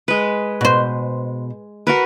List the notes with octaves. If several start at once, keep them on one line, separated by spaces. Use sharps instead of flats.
G#3 B4
B2 C5
F#4 A#4 B4